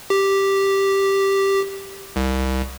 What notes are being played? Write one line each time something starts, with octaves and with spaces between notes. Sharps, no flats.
G4
C2